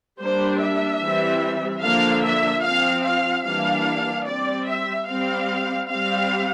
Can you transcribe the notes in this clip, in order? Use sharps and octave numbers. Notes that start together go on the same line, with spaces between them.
G3 A#3 D4 C5
E5
E3 G3 C4
D3 F3 A#3 D4 F5
E5
F3 C4 F5
F5
E3 G3 A#3 D4 F5
G3 C4 D5
E5
G3 C4 F5
G3 C4 F5